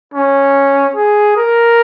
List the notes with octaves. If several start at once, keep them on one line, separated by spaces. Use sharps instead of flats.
C#4
G#4
A#4